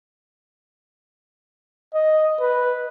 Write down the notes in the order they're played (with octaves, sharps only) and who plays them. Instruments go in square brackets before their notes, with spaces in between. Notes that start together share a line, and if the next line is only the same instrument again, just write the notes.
[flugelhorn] D#5
B4